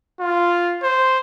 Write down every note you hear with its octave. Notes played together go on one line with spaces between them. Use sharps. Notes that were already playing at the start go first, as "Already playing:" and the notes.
F4
C5